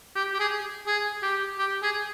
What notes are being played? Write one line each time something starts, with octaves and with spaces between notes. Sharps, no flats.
G4
G4
G#4
G#4
G4
G4
G#4